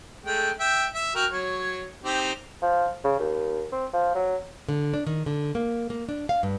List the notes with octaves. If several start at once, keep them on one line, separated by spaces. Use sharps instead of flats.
G#3 A3 G5
E5 G5
E5
F#4 A#4 G5
F#3 C#5
C4 D#4 G4
F3
C#3
D#2
C4
F3
F#3
D3
D4
D#3
D3
A#3
A#3
D4
F5
G2